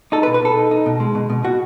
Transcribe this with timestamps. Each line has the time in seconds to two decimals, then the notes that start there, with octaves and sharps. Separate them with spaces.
0.12 D#4 A4
0.23 B4
0.27 B2
0.34 B4
0.42 B2 A4
0.57 D#4
0.71 D#4
0.86 B2
1.00 G#3
1.15 B2
1.30 B2
1.44 B2 F#4